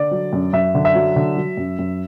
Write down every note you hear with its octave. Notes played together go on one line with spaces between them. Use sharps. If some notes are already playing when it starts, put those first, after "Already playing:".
Already playing: D3 D5
F#3
F#2
F#2 E5
D3
E5
F#3
D3
F#3
F#2
F#2